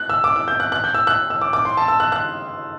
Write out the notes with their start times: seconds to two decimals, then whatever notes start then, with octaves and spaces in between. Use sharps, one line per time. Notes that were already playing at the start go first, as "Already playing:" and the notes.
Already playing: F#6
0.10 E6
0.24 D6
0.36 E6
0.48 G6
0.60 F#6
0.72 F#6
0.84 G6
0.94 E6
1.07 F#6
1.30 E6
1.41 D6
1.53 D6
1.65 C6
1.77 A5
1.88 E6
2.00 F#6
2.12 F#6